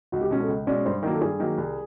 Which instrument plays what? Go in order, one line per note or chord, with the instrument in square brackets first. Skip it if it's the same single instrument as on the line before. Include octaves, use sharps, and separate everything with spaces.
[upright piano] C#2 [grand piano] F#4
[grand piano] G4
[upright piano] B2 G#3 C#4
[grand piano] A4
[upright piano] C#2
[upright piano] B2 G#3 C#4 [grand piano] D5
[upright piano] G2 [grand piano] C5
[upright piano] D#3 F#3 A#3 [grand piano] A#4
[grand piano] A4
[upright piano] G2 [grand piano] G#4
[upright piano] D#3 F#3 A#3
C2